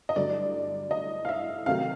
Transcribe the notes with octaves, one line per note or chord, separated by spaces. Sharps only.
D#5
G2 D3 F#3 A3 D5
D#5
F5
E5
C3 D#3 F#3 A3 F5